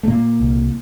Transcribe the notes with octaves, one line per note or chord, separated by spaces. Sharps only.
A3
A#2 A#3
C2